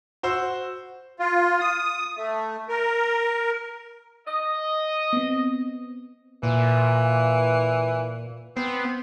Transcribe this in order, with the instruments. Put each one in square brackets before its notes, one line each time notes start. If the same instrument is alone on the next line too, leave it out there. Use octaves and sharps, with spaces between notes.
[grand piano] F#4 C5 C6 E6
[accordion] F4
D#6
A3
A#4
[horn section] D#5 [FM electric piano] D#6
[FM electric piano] B3 C4
[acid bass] A#2 [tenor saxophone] E3
[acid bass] B3 [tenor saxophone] C4